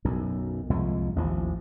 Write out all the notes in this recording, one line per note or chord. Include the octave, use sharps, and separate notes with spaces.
B1 F#2
C2 F2 A#2 G#3
A1 D#2 F3